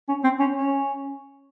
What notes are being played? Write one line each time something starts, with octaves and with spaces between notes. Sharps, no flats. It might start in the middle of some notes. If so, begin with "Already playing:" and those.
C#4
C4
C#4
C#4